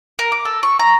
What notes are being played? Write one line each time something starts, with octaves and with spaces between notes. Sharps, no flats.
A#4
D6
A4
C#6
A#5